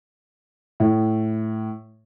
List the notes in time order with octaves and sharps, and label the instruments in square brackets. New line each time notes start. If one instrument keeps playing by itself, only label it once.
[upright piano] A2